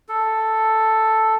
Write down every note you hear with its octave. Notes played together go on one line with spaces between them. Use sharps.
A4